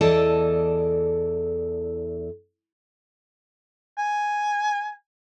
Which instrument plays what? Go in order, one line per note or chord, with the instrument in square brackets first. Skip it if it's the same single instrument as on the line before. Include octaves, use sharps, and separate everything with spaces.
[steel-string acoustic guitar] E2 E3 A4 D5 D#5 A5
[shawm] G#5